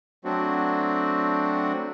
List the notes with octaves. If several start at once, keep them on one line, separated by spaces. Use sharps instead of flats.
F#3 A3 C4 D4 F#4